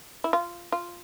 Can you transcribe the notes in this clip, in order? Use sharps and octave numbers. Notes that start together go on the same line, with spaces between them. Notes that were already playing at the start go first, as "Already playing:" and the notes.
E4
F4
F4